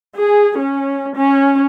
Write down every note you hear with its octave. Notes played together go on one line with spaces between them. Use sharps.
G#4
C#4
C#4